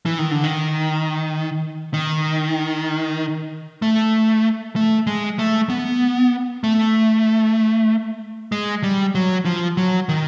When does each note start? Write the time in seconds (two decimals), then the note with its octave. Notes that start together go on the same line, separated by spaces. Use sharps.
0.06 E3
0.18 D#3
0.31 D3
0.44 D#3
1.94 D#3
3.82 A3
4.76 A3
5.07 G#3
5.39 A3
5.70 B3
6.64 A3
8.52 G#3
8.83 G3
9.15 F#3
9.45 F3
9.77 F#3
10.09 D#3